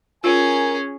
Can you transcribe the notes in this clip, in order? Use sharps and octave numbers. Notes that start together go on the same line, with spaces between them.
C#4 F4 G#4 A#4 G#5